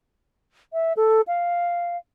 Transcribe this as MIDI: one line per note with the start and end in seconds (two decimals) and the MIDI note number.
0.73 0.93 76
0.97 1.21 69
1.27 1.97 77